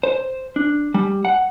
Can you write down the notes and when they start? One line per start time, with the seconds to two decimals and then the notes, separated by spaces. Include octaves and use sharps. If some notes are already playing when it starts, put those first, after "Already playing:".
0.03 C5
0.56 D4
0.94 G3
1.25 F#5